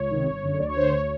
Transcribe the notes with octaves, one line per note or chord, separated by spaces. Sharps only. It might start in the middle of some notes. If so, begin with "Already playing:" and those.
Already playing: C#2 C#5
C3 D#3
G1
F#2 D3
D2 D5
C#5
D3 C5
C#5
D2